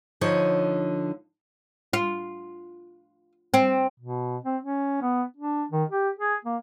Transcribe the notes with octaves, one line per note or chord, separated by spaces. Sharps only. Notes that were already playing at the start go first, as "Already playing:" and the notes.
D3 F3 D#4 C#5
F4
C4
B2
C4
C#4
B3
D4
D#3
G4
G#4
A#3